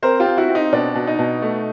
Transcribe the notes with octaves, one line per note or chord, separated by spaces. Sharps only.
C4 A#4 C5
F4 G4
C4
E4 F#4
C4
D#4
B2 D4
B2
D#4
B2
A3